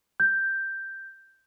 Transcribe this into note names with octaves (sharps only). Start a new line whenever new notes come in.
G6